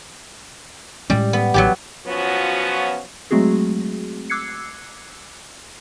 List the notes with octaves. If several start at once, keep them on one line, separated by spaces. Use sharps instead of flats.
A2 G3 G#3 C#4
B3
A1 F#3 B3 G4
F3 F#3 B3 C#4 F4 F#4
F#3 G#3 A3 C4 F#4 G#4
D6 E6 F#6 G#6 C7 C#7